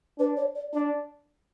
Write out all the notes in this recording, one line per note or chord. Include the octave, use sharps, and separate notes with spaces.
D4 B4
C#5
D5
D4 D5